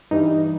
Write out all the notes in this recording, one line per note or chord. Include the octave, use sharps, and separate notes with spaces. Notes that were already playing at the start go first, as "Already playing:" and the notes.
G2 E3 G3 D#4